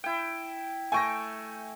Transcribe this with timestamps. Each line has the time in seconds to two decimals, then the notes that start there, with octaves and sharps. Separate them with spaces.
0.04 E4 G5
0.92 A3 G5 G#5 C#6 A#6